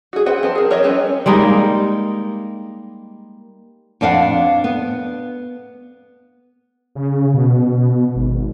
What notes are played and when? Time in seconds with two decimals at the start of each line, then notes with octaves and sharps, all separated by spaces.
0.13 F#4 G#4
0.26 C4 B4 F#5 G5
0.43 C4 B4 A5
0.55 G#4 A#4
0.71 A#4 C#5 D#5 E5
0.84 G3 C4 C#4 B4 C#5
1.26 G3 G#3 A#3 D#4
4.01 F2 D4 F5 F#5
4.64 B3
6.95 C#3
7.34 B2
8.16 G#1